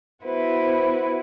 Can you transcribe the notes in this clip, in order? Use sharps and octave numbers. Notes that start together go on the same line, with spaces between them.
B3 E4 F#4 B4 C5